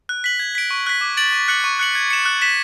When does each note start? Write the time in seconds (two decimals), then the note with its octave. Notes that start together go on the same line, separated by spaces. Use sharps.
0.09 F#6
0.24 B6 F#7
0.39 G#6
0.55 B6 D7
0.71 C#6
0.86 F#6 B6
1.01 D6
1.17 A6 D7 F#7
1.33 C#6
1.48 F#6 C#7 F#7
1.64 C#6
1.79 F#6 C#7 F#7
1.95 G#6
2.10 C#7 E7
2.26 F#6
2.42 B6 E7